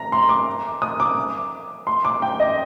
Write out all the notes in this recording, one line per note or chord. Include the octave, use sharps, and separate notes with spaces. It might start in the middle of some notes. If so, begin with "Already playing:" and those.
Already playing: A#5
C6
D6
D#6
D6
C6
D6
G5
D#5